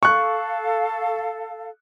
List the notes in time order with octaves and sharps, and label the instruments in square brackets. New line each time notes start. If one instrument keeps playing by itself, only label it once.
[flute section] A4 F5 [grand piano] C#6 F#6